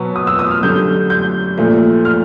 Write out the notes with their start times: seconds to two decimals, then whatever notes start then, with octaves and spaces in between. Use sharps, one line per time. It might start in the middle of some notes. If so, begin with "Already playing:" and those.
Already playing: B2 F#3 B3
0.16 D#6
0.27 E6
0.39 D#6
0.51 F6
0.63 F#2 D3 G3 G6
1.10 G6
1.58 A#2 F3 A3
2.05 F6